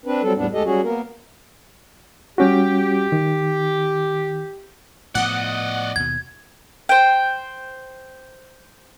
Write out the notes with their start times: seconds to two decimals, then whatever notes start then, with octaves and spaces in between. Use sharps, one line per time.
0.05 C4 D4 B4
0.23 F#3 G3 C4 A4
0.37 E2 A2 G3 B3 D4
0.53 D2 G#3 G4 A4 D#5
0.65 F#3 G3 C#4 F#4 G#4
0.83 A#3 B3 A#4
2.38 G3 C#4 F#4 G4
3.12 D#3
5.15 A2 F3 B3 D5 D#5 F#5
5.96 D#2 B2 G#6
6.89 C5 G5